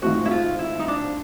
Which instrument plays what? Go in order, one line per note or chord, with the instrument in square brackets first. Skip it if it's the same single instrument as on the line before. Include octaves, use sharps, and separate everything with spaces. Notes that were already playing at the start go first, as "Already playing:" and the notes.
[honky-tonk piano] G#1 G#2 F3 A3 C4 [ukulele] F#4
[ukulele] E4
F4
E4
D#4
D4